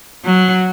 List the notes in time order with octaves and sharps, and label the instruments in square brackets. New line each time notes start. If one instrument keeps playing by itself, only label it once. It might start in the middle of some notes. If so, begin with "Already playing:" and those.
[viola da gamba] F#3